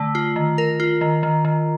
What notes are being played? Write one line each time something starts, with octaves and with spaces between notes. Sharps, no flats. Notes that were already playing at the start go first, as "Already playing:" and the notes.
Already playing: D3 A3
F4
D#3
A#4
F4
D#3
D#3
D#3